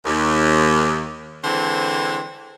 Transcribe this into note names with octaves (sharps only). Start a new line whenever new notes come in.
D#2
D3 E3 G#3 C4 C5